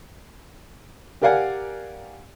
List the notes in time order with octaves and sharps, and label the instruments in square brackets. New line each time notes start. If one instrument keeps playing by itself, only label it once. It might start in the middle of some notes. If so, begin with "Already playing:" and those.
[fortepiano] G4 A#4 D5 F5 F#5 G#5